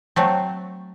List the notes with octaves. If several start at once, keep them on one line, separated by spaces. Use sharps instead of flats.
F#3 A3 C4